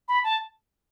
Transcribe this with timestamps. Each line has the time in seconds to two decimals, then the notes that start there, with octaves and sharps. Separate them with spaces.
0.08 B5
0.24 A5